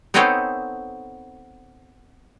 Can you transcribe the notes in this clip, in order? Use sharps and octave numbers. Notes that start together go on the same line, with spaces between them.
B3 C4 D#4 A4 C5 C#5